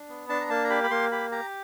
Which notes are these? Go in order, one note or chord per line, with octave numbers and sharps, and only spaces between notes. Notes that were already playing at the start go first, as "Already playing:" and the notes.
Already playing: D4
B3
D4 A5
A#5
A#3 A5
A#5
G4 B5
B5
A#3 C6
G4 B5
G4 A#5